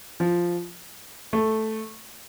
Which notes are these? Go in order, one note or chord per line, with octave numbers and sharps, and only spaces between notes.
F3
A3